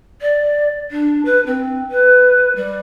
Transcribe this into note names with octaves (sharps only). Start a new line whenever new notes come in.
D5
D4
B4
C4
B4
G3